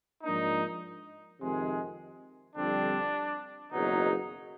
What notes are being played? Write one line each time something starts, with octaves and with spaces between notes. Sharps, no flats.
G#2 F3 A#3 D4 D#4
F2 C3 D#3 G#3
F2 D3 G3 C4 D4
F#1 E2 B2 F#3 D#4